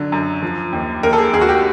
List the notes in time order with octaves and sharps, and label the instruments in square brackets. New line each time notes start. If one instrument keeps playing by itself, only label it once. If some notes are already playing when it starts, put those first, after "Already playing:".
Already playing: [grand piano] D3 F#3
F#2
F3
D#2
D#2 A#4
A4
G#4
D#2 G#4
F#4
G4